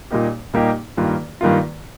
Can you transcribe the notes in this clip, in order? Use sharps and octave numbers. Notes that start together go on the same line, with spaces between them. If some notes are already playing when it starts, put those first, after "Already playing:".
A#2 G3 A#3 D#4 G4
A#2 G3 A#3 D#4 G4
G2 D#3 A#3 F4
G2 D#3 A#3 F4